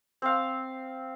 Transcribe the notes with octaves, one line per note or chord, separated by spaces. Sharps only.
C4 F5